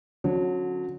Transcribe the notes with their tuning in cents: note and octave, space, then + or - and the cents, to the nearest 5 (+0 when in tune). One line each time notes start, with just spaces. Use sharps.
D3 +0 F#3 -25 C#4 -25